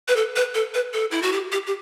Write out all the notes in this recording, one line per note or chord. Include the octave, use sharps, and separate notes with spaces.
B4
A4
B4
A4
B4
A4
E4
F#4
G4
G4
G4